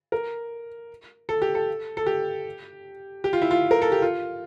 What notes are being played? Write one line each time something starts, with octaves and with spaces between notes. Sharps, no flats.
A#4
A4
G4
A4
A4
G4
G4
F4
E4
F4
A#4
A4
G4
F4